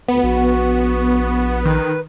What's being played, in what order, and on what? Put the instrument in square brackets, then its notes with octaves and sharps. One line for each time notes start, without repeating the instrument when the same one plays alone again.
[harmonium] D2 [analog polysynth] B3
[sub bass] A#1 [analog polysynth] B3 [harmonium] F#4
[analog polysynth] D#3 [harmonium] B4